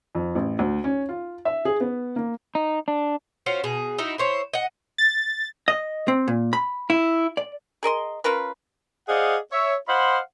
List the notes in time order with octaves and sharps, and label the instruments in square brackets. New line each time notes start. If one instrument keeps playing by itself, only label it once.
[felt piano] F2
A1
D2
C#4
F4
E5
G#4
B3
A#3
[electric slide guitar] D#4
D4
[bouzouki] C#4 F4 F#4 C5
B2 G#4
D#4 E4 F#4
E4 C5 C#5
D#5 F#5
[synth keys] A6
[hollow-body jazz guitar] D#5
C4
A#2
B5
E4
D5
[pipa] G#4 A#4 D#5 C6
C#4 F4 A#4 B4
[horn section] G#4 C5 D5 D#5 F5 F#5
C#5 E5
C5 D#5 F5 F#5 B5 C6